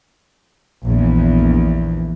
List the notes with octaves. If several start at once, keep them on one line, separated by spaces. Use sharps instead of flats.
A#1 E2